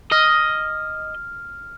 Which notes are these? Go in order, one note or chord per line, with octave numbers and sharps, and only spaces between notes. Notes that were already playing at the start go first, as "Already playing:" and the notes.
D#5 F6